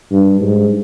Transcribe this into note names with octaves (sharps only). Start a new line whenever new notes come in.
G2
G#2